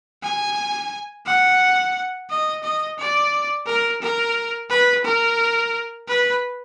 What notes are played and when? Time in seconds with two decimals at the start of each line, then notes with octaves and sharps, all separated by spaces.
0.23 G#5
1.26 F#5
2.30 D#5
2.63 D#5
2.98 D5
3.66 A#4
4.02 A#4
4.70 B4
5.05 A#4
6.08 B4